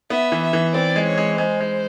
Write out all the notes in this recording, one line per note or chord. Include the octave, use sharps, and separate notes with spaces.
B3 E5
E3
E5
E3
C4 D5
G#3
C#5
G#3
G#3 C5
G#3